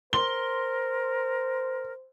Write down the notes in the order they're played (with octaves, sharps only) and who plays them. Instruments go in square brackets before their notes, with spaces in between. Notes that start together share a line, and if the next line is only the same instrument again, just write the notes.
[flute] A#4 [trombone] C5 [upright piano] C6 G7